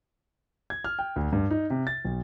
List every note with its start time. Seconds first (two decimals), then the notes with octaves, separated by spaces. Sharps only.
0.70 G#6
0.84 F6
0.99 G5
1.16 D2
1.33 G2
1.51 D#4
1.70 C3
1.87 A6
2.05 B1